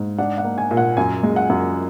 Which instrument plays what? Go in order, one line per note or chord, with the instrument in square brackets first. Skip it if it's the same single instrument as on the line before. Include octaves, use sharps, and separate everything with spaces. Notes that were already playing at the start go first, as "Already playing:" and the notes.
Already playing: [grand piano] G#2
D4 F#5
F#5
A#3
G#5
A#2
F#5
F#2 G#5
G#3
F#5
F#2